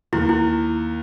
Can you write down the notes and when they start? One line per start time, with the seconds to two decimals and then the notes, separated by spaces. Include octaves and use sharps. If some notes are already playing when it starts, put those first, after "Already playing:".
0.13 D#2 E4
0.29 E4